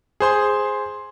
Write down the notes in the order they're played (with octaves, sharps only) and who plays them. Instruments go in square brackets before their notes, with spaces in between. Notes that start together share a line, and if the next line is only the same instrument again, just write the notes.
[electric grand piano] G#4 C5 C6